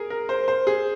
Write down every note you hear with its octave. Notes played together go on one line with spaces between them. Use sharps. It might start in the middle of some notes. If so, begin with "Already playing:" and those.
Already playing: G#4 A#4
A#4
C5
C5
G#4